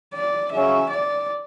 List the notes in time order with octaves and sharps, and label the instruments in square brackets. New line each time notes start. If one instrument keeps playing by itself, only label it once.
[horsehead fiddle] D5
[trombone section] C#3 F#3 C#4 [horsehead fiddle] E5
[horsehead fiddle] D5